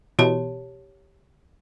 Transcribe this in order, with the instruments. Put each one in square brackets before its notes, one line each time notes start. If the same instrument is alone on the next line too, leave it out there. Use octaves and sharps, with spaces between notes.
[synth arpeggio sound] B2 E3 [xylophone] G4 C#5 A5